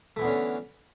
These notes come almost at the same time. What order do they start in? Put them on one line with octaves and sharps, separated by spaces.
A3 E3 B3 D3 C#4